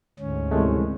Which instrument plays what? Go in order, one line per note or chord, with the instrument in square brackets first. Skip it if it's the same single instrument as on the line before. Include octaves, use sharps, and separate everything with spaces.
[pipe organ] D2 G#2 C#4
[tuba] C2 [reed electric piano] E3 G#3 A3